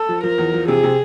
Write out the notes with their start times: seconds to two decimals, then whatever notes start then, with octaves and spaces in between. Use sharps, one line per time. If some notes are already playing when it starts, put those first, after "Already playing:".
Already playing: A4
0.09 F3
0.23 F3 A#4
0.38 E2
0.54 F3
0.68 C3 G#4
0.84 C3